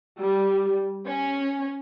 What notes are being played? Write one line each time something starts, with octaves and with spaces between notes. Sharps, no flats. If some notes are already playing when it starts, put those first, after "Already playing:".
G3
C#4